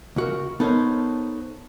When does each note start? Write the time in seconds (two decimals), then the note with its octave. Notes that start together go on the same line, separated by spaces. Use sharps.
0.16 C#2 F#4 A#4
0.60 B3 D#4 A4 A#4 C5 C#5